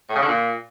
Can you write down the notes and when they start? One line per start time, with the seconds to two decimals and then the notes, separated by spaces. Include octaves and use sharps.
0.09 A2
0.16 C#3
0.22 D3
0.28 A#2